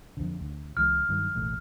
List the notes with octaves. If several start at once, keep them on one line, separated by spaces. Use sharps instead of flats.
F2 D3
D2
C#2 E3 G#3 F6
G2 D#3 F#3
E1 A1 A3